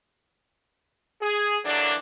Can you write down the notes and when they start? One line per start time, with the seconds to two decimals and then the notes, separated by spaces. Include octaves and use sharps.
1.21 G#4
1.64 D3 E3 F#3 A#3 D4